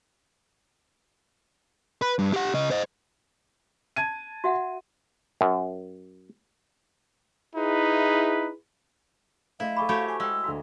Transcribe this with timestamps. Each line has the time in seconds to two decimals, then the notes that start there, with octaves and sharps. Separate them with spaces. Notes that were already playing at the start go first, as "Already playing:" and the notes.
2.02 B4
2.19 G2
2.34 G4 F#5
2.54 C#3 D#5
2.71 C5 D#5
3.96 A5 G#6 D#7
4.44 F#4 E5 F#5
5.41 F#2
7.55 D#4 E4 G#4 B4
9.60 A3 E4 C5 D#5 F5
9.77 A4 G#5 B5 C#6 D6
9.89 A3 F#4 G4 C#5 B5
10.09 G#5 C#6
10.20 G#3 F5 G5 D6 E6
10.44 D2 F#4 F5 A#5